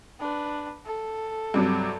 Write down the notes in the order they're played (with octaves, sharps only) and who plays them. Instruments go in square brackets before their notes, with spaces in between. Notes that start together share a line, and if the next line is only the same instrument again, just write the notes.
[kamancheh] D4 B4
A4
[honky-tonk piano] G2 C3 F#3